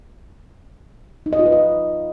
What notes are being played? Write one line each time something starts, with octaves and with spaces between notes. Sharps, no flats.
D#4
D#5
F4
B4
D#5